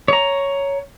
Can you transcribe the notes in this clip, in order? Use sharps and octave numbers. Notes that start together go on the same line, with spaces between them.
C#5 A#5